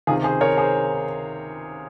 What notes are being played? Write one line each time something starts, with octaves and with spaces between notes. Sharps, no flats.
C#2 C3 D#3 F4 G#4
G#4 C5
A#4 C#5
G#4 C5